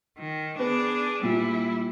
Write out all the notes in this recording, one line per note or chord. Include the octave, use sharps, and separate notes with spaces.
D#3
B3 D4 G#4
A#2 G3 E4